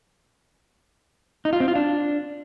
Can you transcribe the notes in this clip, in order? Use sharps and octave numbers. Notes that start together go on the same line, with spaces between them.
D#4
F4
C4
F4
D4